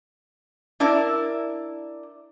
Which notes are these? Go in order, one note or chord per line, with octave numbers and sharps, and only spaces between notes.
D4 E4 A#4 D5 E5